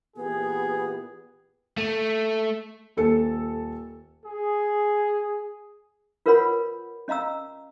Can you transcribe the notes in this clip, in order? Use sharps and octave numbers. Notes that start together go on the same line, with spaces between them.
A#2 E3 B3 G4 G#4
A3
D#1 A4 C#7
G#4
F4 A#4 B4 C#5 F#5 B5
C#4 D#5 F5 A#5 E6